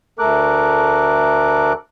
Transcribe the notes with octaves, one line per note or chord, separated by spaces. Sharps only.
D2 A3 A4 A#4 D6 F#6